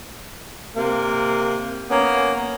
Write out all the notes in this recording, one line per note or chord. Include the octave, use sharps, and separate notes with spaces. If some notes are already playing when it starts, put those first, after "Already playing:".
C3 A#3
A#3 B3 C#4